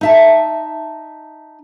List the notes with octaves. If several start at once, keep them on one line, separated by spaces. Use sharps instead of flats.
D#4 E5 A5